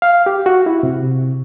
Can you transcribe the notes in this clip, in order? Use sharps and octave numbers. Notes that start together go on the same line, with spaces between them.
F5
G4
F#4
E4
C3